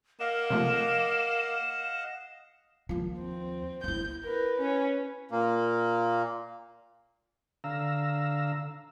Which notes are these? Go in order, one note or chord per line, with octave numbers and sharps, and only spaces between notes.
A#3 D#5 F5 F#5 E7
C3 F3 A3
D#2 F3
C4
D#4 E4 G6
A#4 B4
C#4 B4
A#2 A#3
D3 F5 A#5 E6